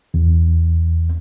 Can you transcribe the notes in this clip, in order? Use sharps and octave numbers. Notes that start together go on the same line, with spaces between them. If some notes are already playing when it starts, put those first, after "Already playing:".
E2